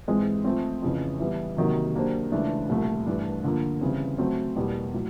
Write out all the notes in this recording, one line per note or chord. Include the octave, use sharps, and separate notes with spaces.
G#2 E3 G#3 C4
F3 A3 C4
F2 C#3 E3
E3 G3 B3
C3 D#3 F#3 A#3
F#3 A#3 D4 G4 C5
C#2 C#3 E3 A3 D4
C2 A#2 F3 A3
G2 E3 A3 D4
D3 F3 A#3
C#3 E3 G3 C4
F#3 A3 C4
E2 B2 G3 A#3
A2 F#3